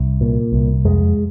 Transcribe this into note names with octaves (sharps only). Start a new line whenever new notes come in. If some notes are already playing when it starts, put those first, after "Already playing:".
Already playing: C2
A#2
C2
F2 G#3